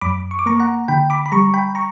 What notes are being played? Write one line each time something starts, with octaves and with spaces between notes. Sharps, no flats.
F#2 B5 D6
C#6
D6
A#3 A#5 C#6
F#5 A#5
D3 G5 B5
B5 D6
B5
G3 A#5 C#6
G5 B5
A#5 C#6